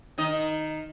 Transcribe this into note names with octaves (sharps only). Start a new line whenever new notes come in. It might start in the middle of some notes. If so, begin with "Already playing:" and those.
D#3 D#4 D#5